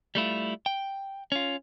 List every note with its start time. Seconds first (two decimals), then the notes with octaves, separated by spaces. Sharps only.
0.15 G3 A3 E4 F4
0.66 G5
1.32 C#4 F4